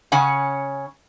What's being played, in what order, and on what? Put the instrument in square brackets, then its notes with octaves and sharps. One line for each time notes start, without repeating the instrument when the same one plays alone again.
[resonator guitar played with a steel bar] C#3 C#4 F#5 G#5